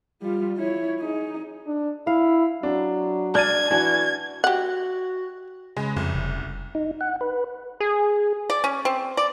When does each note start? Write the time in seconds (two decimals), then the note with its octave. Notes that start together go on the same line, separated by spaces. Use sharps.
0.22 G3 F4
0.57 E4 C#5
1.00 D#4 G#4
1.67 D4
2.07 E4 F5
2.63 F#3 D4
3.35 D4 F6 G#6 A6 D#7
3.71 E3 D4 F#4 G#5
4.44 F#4 G4 F#5
5.77 C#3 G#3 B4
5.96 C2 F2
6.14 F1
6.75 D#4
7.01 F#5
7.21 B4
7.80 G#4
8.50 D5
8.64 C#4
8.85 C4
9.17 D5